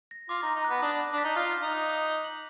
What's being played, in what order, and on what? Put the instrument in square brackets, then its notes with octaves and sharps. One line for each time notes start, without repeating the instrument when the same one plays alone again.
[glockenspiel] A#6
[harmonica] F4 [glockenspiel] D6
[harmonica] D#4
[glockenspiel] A#6
[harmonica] D#4
[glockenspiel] F#6
[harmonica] B3
[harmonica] D4 [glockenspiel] D#6
[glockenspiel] F#6
[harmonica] D4
[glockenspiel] B6
[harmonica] D#4
[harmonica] F4 [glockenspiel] D#6
[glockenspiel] F#6
[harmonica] D#4
[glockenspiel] D#6
D#6
D#6
F#7